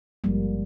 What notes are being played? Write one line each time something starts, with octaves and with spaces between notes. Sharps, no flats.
G#1 G2 F3 G3 G#3 A#3